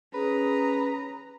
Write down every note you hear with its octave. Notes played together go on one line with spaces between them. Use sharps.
C#4 G#4 B4 A#5